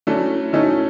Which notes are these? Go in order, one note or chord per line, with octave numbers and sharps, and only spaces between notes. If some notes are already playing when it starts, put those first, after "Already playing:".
F#3 A3 C#4 D4 E4 A4
F#3 A3 C#4 D#4 E4 A4